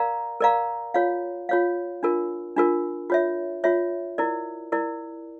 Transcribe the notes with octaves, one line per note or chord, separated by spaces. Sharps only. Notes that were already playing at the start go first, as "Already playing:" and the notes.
Already playing: A#4 D5 F5 A#5
A#4 D5 F5 A#5
F4 C#5 F5
F4 C#5 F5
D4 F4 A#4
D4 F4 A#4
F4 C#5 E5
F4 C#5 E5
E4 A#4 D5
E4 A#4 D5